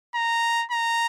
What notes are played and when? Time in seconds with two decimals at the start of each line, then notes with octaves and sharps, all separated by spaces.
0.15 A#5
0.71 A#5